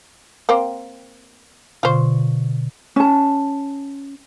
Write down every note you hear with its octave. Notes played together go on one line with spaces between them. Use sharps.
A#3 C4
B2 D3 F4 C5 C#6
C#4 A5